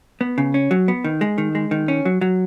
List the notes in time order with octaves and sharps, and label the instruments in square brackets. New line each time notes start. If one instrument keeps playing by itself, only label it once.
[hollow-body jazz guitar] B3
C#3
C#4
F#3
B3
D#3
G#3
D#3
G#3
D#3
C#4
F#3
F#3